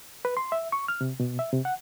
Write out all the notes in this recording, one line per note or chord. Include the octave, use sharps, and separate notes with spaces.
B4
C6
E5
C#6
F6
C3
B2
E5
C3
F#5